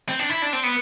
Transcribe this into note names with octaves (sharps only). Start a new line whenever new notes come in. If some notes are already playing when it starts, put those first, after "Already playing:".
C4
D4
E4
D4
C4
B3